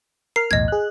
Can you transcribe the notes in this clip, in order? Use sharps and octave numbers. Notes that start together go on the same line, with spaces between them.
A#4 F6 C7
B1 E2 A2 D#5 G#6
G#4 F#6